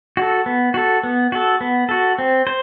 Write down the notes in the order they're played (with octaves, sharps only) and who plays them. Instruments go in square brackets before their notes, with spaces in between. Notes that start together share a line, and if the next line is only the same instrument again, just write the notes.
[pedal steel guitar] F#4 A4
B3
F#4 A4
B3
F#4 A4
B3
F#4 A4
C4
C5